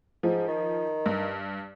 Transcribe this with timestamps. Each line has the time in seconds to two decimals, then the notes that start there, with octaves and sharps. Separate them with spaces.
0.23 G#2 F3
0.48 D#3
1.06 G2